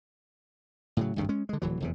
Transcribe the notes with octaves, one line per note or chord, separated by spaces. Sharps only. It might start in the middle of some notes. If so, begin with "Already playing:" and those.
A2 C#3 F#3
G#1 D2 G2 C#3
G#3 C#4
D3 G#3
D1 E3 F#3
F1 E2 C3